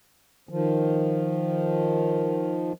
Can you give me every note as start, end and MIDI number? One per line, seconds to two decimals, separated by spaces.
0.49 2.73 51
0.49 2.73 53